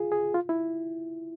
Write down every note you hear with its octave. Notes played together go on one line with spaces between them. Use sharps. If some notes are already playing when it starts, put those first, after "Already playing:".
Already playing: F4 G#4
G#4
F4
E4